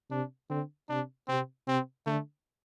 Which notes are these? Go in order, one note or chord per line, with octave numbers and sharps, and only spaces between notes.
C3 D4
D3 C4
C3 D4
C3 C4
C3 C4
D3 A3